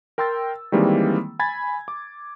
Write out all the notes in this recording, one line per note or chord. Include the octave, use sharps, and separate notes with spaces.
A#4 G5 C6 E6 A6
D#3 E3 G3 G#3 A#3 C4
G#5 B5 G#6 A6
D6